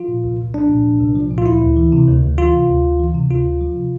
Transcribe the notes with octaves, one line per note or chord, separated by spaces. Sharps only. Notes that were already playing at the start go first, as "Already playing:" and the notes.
Already playing: F3 F4
A#2
C2
C2
F3 D4
A#2
C2
C2
F3
A#2
F4
D2 E4
D2
E3
C3
D2
D2
E3 F4
C3
D2
D2
E3
C3
D2 F4
D2
F3
C3